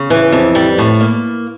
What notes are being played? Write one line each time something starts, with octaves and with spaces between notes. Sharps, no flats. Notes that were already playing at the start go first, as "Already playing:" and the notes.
Already playing: C#3
E3
F2
G3
A2
A#3